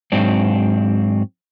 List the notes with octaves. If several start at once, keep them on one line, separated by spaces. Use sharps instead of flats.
G#2 F#3 C4 D4